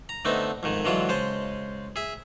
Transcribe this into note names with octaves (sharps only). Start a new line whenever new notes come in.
A#5
D3 A3 B3 C4 D#4
F2 G#2 D#3
D3 E3 F#3 G#3 F4
C#3 G#3 C5 A5
G#4 E5